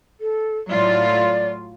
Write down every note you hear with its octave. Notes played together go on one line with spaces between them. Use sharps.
A4
A2 F#3 F4 D5